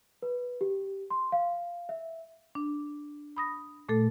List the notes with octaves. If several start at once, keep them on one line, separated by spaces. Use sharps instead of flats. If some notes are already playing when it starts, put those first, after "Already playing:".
B4
G4
C6
F5
E5
D4
B5 D#6 A#6
A#2 A3 A4